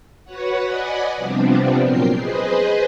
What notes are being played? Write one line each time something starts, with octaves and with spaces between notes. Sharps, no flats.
F#4 B4 C#5 F#5
D5 D#5 F#5 G#5 B5
C3 F3 G3 B3 C4 D4
A#2 F#3 F4 A#4 G5 C7
G#4 B4 C5 D#5